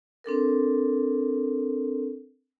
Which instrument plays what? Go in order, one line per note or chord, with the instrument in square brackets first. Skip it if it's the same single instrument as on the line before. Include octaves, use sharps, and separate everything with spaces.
[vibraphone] C4 D4 A4 A#4